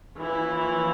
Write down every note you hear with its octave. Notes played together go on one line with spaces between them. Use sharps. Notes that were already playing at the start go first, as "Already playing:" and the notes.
E3 F3 A#3 C#4 E4